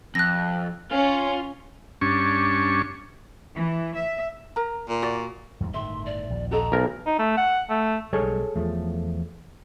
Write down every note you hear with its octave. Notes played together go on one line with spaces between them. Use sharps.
F2 F#6 A#6
C#4 F4
G2 C#4 D4 C#6
E3
E5
A#4 A#5
A#2
F#4 D5
E2 G#2 G3
G1 A2 D#3 E5 C6
D5
A#1 D#2
F#4 A4 D#5 A#5
B1 A#4
D#4
A3
F#5
A3
B1 G3 G#3 G#4 A4 C#5
E2 F3 A3